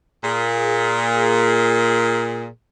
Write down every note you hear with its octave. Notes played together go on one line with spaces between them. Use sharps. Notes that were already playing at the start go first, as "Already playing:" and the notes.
A#2 G#4